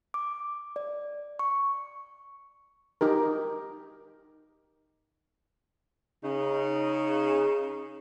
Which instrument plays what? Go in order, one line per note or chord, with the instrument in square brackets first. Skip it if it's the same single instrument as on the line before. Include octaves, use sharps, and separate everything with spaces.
[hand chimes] D6
D5
C#6
[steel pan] D#4 G4 A#4
[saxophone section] C#3 D#4